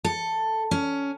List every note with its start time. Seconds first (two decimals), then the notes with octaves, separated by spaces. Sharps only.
0.04 A4
0.71 C#4